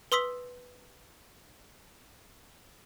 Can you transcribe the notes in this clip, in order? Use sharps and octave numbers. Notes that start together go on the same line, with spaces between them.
B4 C6 D#6 E6 B6 G7